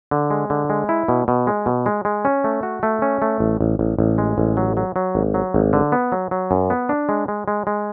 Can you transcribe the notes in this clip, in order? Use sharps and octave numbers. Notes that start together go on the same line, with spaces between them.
D3
G#3
D3
G#3
E4
B2
B2
G#3
B2
G#3
G#3
C#4
A3
F#4
A3
C#4
A3
A1
A1
A1
A1
G#3
A1
F#3
F#3
F#3
G#1
F#3
G#1
D3
B3
F#3
F#3
F#2
B3
D4
G#3
G#3
G#3
G#3